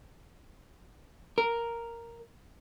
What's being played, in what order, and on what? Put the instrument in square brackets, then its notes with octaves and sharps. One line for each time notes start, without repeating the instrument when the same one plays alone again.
[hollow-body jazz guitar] A#4